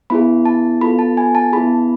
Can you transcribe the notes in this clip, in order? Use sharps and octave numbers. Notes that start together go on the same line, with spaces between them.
B3 E4 G#4 B5
A5
B3 F4 A4 B5
A5
G#5
A5
B3 E4 G#4 B5